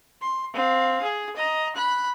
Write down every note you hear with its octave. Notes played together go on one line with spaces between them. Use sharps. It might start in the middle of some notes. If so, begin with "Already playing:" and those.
C6
C4 F5
G#4
D#5 A#5
B5 F#6